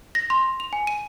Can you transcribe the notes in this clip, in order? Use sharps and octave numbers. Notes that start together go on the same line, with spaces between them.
A#6
C6
F7
G#5
D#7